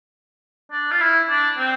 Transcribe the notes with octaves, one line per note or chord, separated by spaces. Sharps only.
D4
F4
E4
D4
C4